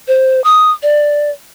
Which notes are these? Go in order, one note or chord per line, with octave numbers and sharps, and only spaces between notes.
C5
D#6
D5